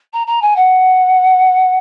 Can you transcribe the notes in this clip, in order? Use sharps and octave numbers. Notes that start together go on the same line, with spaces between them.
A#5
A#5
G#5
F#5